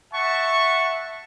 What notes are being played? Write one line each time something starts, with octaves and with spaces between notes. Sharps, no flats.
E5 F#5 A5 C#6